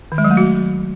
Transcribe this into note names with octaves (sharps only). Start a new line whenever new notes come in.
D#3
G#3
F#3
A3
F#4